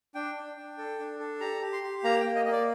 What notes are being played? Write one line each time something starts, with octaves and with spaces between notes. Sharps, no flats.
D4 G5
D4
D4
A4
D4
A4
G4 A#5
G4
C6
G4
A#3 A#5
A#3 G5
D#5
A#3 D#5
D5